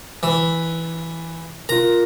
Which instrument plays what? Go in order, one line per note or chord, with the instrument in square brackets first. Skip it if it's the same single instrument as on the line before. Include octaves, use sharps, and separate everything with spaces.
[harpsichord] E3
[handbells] F4 A#4 [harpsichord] A#5